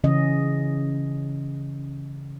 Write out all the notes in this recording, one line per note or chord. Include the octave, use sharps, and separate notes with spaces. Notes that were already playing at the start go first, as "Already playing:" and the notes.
C#3 E3 C#4 D#5